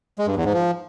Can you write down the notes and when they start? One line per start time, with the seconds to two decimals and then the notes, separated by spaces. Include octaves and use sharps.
0.18 G#3
0.27 G2
0.36 E2
0.45 G#2
0.53 F3